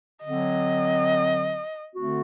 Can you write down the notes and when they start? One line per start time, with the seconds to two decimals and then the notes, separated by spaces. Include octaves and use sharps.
0.23 D3 F#3 C4 D#5
1.94 D3 A3 C4 F#4